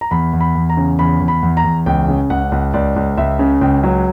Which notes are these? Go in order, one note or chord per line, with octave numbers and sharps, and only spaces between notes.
A#5
E2 B5
E2
B5
E2
A#5
C#3
E2 B5
E2
B5
E2
A#5
E2
C#2 G5
C#3
C#2 F#5
C#2
C#2 D5
C#2
C#2 E5
C#3
C#2 G5
F#3